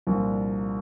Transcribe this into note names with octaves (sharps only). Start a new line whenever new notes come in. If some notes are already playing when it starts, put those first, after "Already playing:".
C2 A#2 F3 A#3 D4